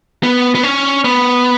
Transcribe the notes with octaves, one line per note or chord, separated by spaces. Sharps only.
B3
B3
C#4
B3